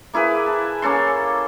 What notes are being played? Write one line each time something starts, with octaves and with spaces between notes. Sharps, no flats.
A#3 E4 G#4 B4
A5
A#3 C#4 A4 C6